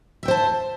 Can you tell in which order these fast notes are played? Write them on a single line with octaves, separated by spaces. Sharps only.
E5 G5 C5 A5